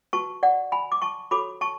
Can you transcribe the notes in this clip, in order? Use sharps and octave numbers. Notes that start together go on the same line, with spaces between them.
F#4 B4 A5 C#6
D5 F#5
G#5 B5
D6
A5 C#6
F#4 A4 C#5 B5 D6
A5 C#6